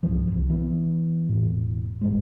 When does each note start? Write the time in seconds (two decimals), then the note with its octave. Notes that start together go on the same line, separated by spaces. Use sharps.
0.03 C2 G2 E3 F3
0.27 E1 C2
0.50 E3 B3
1.29 E1 A2
2.01 E1 A1 G2 G#3